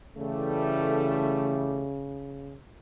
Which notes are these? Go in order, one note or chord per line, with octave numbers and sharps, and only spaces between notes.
C#3 E3 G3 A3